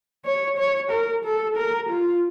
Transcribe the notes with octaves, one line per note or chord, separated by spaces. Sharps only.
C#5
C#5
A#4
A4
A#4
F4